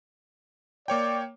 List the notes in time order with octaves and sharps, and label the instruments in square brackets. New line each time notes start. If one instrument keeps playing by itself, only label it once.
[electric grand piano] A#3 C#5 G5 [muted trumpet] D5